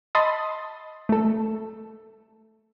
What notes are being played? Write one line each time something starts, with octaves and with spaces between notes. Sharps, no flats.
D#5 A5 B5 C6 D#6 A6
A3 A4